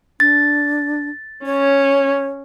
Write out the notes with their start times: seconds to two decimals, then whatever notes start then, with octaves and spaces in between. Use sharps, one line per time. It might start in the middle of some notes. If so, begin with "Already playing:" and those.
0.20 D4 A6
1.46 C#4 C#5